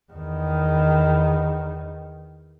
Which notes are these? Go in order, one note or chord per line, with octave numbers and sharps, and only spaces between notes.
E2 D#3